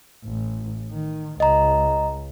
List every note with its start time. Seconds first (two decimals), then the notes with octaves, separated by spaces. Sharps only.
0.24 A1
0.92 D#3
1.40 C#2 D#5 A#5